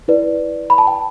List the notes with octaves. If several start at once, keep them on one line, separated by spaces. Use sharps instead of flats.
E4 B4 D5
B5
A5
G5